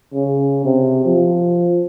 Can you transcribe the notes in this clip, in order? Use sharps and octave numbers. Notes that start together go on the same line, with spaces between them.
C#3
C3
F3